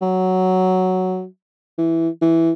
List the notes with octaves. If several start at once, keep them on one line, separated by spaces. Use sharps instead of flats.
F#3
E3
E3